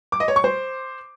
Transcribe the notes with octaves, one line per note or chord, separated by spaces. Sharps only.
D6
D#5
C#5
C#6
C5